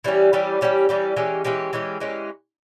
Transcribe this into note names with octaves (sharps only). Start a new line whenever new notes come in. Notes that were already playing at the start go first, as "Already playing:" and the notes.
E3 G3 C#4 G4
E3 G3 C#4 G4
E3 G3 C#4 G4
E3 G3 C#4 G4
E3 G#3 C#4 G4
E3 G#3 C#4 G4
E3 G#3 C#4 G4
E3 G#3 C#4 G4